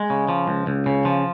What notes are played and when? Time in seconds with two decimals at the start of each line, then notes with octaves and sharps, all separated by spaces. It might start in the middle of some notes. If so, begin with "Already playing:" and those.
Already playing: G#3
0.10 C#3
0.29 F3
0.48 C#2
0.67 C#2
0.86 C#3
1.05 F3